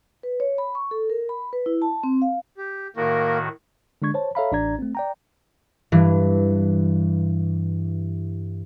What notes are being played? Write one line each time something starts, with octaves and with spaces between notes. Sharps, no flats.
B4
C#5
B5
C#6
A4
A#4
B5
B4
E4
A5
C4
F5
G4
A2 D#3 A#3 F#4 A#4
D3 G#3 D4 C#6 G#6
C5 C#5 A5
A4 C#5 E5 F5 A#5 B5
A1 D4 D5 A#5 G#6
A3 C4
D5 G5 A#5
G2 E3